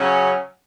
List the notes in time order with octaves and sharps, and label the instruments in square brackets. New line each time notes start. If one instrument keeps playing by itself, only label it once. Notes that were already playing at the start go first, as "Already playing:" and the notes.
Already playing: [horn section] C#3 F#3 C#4